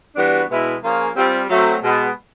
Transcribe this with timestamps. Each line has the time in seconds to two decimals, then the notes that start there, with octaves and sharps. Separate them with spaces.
0.16 E3 G3 B3 D4 F#4
0.49 B2 G#3 B3 E4
0.82 F3 A#3 C#4 F4 G#4
1.16 G3 C4 F4
1.49 F#3 A3 C4
1.82 B2 G#3 B3